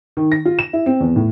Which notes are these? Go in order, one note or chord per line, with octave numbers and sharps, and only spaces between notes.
D#3
A#6
F4
E7
E4
C4
E2
A2